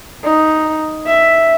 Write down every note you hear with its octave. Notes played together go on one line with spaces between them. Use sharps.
D#4
E5